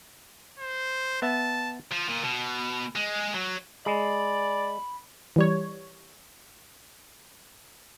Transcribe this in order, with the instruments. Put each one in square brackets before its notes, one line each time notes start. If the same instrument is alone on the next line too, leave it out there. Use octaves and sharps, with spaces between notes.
[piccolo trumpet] C5
[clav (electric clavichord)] B3 E5 [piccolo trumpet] A5
[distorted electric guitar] F3
A#2
B2
G#3
F#3
[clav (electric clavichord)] G#3 [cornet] D5 [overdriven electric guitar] B5
[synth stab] E3 G3 C#5